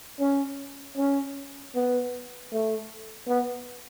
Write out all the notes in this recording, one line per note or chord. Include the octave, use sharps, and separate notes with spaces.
C#4
C#4
B3
A3
B3